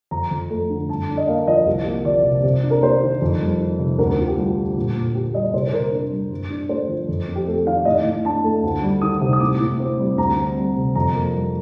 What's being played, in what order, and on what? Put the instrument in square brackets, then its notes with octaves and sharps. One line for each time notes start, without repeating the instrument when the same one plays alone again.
[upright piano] F2 A#5
F2
A3
D3
G2 A5
D4
D#5
A#3 F5
F3 D#5
C2
A#3
F3 D5
C3
C3
D4
A#4
A#3 C5
D#3
F2
G3
D#3
C3
D2 A#4
D2 F4
G4
G3 F4
D3
A#2
A#2
A#3 G4
G3 D#5
C3 C5
C5
C3 A#4
D4
G3
G2
D4
A3 C5
F3
F2
C4
G4
A3 A4
D#3 F5
A2 D#5
A2
D4 A5
A3
D2
G3
D#3 D#6
C3
D#6
A2 D6
A2
C4
G3
D2 A#5
C4
G3
C3
F2 A#5
A#3
G3